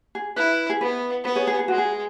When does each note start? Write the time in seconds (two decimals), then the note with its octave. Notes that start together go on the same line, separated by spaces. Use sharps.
0.15 G#4
0.36 E4 B4
0.70 G#4
0.81 B3 B4
1.24 B3 B4
1.35 G#4 C#5
1.47 G#4
1.59 G#4
1.68 G#3 F#4
1.78 G#4